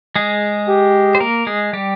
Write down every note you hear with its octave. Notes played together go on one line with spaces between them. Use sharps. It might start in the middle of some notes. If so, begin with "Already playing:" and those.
G#3 G#4
G4
C5
A#3 A#4
G#3 G#4
G3 G4